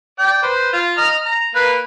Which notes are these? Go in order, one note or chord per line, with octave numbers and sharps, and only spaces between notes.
D5 G5
B4 C5
F4
D#5 A#5 F6
A#5
A#3 B4